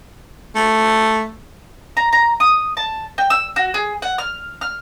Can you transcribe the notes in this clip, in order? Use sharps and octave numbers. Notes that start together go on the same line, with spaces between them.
A3
A#5
A#5
D#6
A5
G5
E6
F#4
G#4
F#5
F6
F6